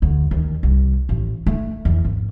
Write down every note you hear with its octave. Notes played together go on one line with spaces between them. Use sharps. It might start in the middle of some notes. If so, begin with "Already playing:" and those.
D2
D#2
C2
A1
A3
E2
G#1